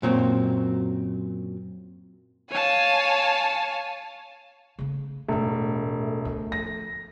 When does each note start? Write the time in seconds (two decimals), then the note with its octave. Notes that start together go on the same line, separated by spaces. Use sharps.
0.02 F#2 A#2 F#3 C4
2.51 C#5 F5 G#5 A5
4.79 C#3 A3
5.28 E1 A1 G#2 A3
6.25 D2
6.52 F3 A#6